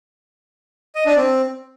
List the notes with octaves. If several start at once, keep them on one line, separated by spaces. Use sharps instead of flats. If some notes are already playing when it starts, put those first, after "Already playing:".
D#5
D4
C4